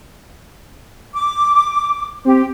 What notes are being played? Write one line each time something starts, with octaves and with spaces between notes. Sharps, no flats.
D6
C4 G4